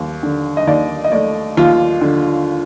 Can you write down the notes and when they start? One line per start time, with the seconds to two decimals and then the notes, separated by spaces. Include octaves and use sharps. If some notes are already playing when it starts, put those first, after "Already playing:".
Already playing: D#2
0.23 D3
0.57 D#5
0.67 D#2 D5
1.04 D#5
1.12 A3 D5
1.57 D#2 F4
2.01 D3